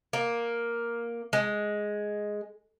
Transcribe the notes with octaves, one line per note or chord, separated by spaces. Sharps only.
A#3
G#3